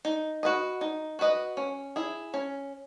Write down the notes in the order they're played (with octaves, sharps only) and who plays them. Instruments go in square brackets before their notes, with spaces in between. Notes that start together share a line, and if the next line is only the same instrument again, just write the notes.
[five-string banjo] D#4
F#4 B4 D#5
D#4
F#4 B4 D#5
C#4
E4 G#4
C#4